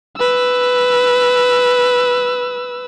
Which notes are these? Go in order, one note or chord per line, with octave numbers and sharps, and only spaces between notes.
B4 E6